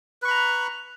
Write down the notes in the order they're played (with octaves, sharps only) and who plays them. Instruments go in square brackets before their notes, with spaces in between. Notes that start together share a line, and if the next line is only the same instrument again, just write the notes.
[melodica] B4
C#6
B5
A#5